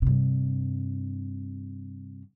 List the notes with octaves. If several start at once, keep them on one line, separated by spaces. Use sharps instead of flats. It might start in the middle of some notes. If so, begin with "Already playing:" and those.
G2 C3